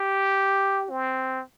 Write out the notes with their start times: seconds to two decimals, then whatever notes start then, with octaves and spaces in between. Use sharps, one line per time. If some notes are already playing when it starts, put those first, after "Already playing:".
Already playing: G4
0.90 C4